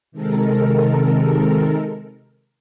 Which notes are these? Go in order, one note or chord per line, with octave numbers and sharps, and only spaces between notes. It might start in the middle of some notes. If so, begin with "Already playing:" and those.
C3 D#3 G#3 A4 A#4